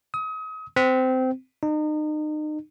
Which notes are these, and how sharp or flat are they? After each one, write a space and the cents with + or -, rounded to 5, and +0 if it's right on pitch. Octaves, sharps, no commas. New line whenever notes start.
D#6 +35
C4 -20
D#4 -35